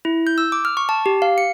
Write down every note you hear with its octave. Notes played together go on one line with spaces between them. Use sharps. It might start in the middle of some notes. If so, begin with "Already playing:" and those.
E4
G6
E6
D6
F6
C#6
A5
G4
F5
C#7